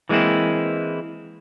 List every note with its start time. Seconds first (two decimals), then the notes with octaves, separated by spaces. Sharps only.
0.09 E3 G#3 A#3 C4 E4